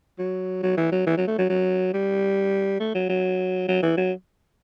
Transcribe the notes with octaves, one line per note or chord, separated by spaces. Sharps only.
F#3
F#3
E3
F#3
E3
F#3
A3
F#3
F#3
G3
A3
F#3
F#3
F#3
E3
F#3